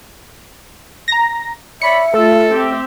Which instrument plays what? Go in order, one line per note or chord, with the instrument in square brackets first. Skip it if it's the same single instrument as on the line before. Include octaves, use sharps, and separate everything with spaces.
[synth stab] A#5 A#6
[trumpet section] C#5 D5 B5 [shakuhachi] E5 [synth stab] C#7
[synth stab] A3 [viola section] F4 [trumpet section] A4
[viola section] C4 G4 E5